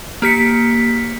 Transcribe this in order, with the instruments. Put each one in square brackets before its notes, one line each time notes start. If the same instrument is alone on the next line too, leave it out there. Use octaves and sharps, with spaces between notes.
[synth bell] A#3 G4 B6 C#7